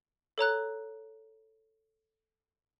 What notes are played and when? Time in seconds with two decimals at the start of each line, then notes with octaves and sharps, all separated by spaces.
0.38 A4 C#5 A#5 F#6